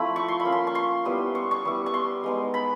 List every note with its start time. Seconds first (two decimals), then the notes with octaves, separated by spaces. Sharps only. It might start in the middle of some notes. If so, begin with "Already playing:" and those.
Already playing: F3 A3 C4 E4 B5
0.16 C#6
0.28 C6
0.40 B5
0.45 A#3 C#4 F4
0.52 C6
0.67 C#6
0.75 C6
1.05 G3 B3 E4
1.35 C#6
1.51 C#6
1.65 G3 B3 E4
1.86 C#6
1.94 C6
2.24 G#3 B3 D#4
2.54 B5